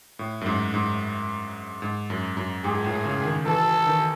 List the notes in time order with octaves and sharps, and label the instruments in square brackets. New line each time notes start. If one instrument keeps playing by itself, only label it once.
[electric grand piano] A2
F#2
G#2
G#2
G#2
F#2
F#2
[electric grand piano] G#2 [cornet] G#4
[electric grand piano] A2
C#3
D#3
[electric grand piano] E3 [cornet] A4
[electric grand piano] D#3